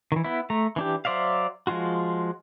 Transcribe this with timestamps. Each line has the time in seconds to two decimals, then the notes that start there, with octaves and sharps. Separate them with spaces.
0.12 D#3 E3
0.24 B3 E4
0.50 A3 A#5
0.76 E3 D4 G4
1.05 F#3 C5 D5 E5 F5
1.67 F3 G#3 F4 F#4